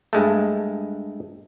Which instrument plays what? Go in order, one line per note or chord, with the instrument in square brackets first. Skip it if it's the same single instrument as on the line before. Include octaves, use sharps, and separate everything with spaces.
[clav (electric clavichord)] G2 G#3 A3